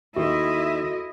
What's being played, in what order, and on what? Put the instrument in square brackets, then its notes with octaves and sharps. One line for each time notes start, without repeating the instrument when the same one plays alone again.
[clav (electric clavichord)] D#2 D#3 [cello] E4 D#5 [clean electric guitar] F#4 A4 C5 [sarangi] E5